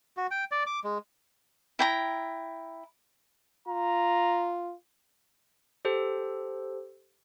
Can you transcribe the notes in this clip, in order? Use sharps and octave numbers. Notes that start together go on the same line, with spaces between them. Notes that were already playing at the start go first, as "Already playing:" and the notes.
F#4
G5
D5
D6
G#3
E4 G5 A#5
F4 A#5
G4 A4 C5